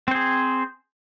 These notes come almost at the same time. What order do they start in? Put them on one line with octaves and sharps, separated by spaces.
C4 C5 G#4